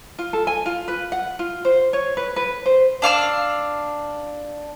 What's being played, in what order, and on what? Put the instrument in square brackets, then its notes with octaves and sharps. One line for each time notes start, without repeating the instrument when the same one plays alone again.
[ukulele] F4
A4
G#5
F4
B4
F#5
F4
C5
C#5
B4
B4
C5
[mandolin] D4 F5 C#6 E6